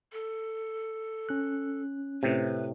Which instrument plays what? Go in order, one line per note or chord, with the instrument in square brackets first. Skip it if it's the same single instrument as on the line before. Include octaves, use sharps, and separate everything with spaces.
[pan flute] A4
[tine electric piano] C#4 F#6
[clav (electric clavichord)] A2 C3 [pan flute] B4